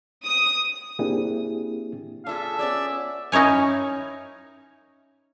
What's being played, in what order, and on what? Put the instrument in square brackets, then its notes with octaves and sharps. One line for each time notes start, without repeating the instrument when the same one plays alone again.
[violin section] D#6
[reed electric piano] A#3 C4 D4 E4 G4 G#4
[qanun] D4 F4 G#4 [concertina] A4 [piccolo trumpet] E5
[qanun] B3 C#4 G#4 [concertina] D5
[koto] C#4 D#4 E4 C#5 G#5